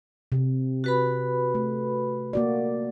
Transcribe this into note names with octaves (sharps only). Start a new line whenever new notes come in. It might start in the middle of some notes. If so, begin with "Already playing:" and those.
C3
F#4 B4 B5
A3
A#3 F#4 D5